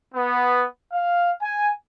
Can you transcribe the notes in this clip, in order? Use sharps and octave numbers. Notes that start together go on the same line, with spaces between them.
B3
F5
G#5